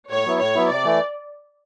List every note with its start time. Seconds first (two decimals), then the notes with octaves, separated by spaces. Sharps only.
0.10 A2 C#5
0.25 F#3 B3 E4
0.39 A2 C#5
0.55 F#3 B3 E4
0.70 C3 D5
0.84 E3 A3